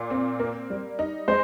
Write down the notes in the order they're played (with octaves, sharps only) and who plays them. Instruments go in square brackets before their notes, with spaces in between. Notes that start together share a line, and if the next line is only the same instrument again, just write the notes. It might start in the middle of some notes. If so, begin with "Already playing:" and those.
Already playing: [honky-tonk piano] A#2
C4
A#3
G3
D#4
[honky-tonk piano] G#3 [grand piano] C5